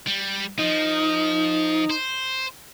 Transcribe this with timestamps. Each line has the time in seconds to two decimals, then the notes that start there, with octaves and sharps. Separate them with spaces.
0.07 G3
0.59 F3 D#4
1.90 C5